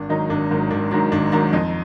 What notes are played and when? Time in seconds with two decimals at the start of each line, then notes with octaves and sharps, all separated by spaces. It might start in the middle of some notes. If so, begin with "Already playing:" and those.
Already playing: G#1 D4
0.09 G#2 D#3 F#3 D#4
0.30 G#1 D4
0.51 G#2 D#3 F#3
0.71 G#1 D4
0.91 G#2 D#3 F#3 D4
1.12 G#1 D4
1.32 G#2 D#3 F#3 D4
1.53 F2 D#4